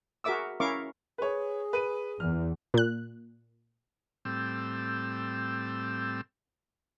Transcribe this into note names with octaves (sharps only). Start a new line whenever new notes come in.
F#4 G#4 A#4 E5 D6 E6
C#4 E4 A#4 F5 C#6 D6
G#4 B4 C#5
B4 D#7
E2 F6
A#2 F#6
A2 G3 C4 E6